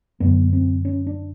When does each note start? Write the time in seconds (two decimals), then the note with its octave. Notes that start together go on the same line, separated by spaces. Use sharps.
0.20 F#2 D3 B3
0.53 C4
0.85 C#4
1.07 D4